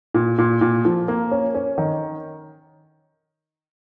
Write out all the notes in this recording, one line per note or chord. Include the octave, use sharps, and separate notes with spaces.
A#2
A#2
A#2
F3
A#3
C#4
C#4
D#3